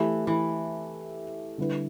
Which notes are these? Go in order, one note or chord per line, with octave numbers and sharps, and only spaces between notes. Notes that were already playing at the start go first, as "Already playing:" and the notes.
Already playing: E3 A3 G4 E5
E3
D3 G3 E4 B4